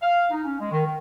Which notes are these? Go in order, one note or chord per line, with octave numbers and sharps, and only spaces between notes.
F5
D#4
C#4
G#3
D#3
D#3